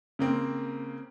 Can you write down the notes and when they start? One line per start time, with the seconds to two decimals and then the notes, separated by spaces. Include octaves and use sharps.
0.19 C#3 A#3 C4